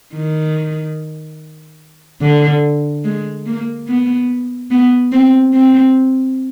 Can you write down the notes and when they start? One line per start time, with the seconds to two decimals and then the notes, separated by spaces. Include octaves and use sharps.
0.14 D#3
2.22 D3
3.04 G#3
3.46 A#3
3.88 B3
4.71 B3
5.12 C4
5.54 C4